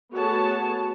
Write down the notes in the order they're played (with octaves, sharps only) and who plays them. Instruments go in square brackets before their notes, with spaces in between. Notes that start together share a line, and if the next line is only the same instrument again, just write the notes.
[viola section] A3 B3 F#4 G#4 C#5 A5